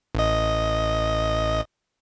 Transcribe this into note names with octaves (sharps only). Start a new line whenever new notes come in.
A1 D#5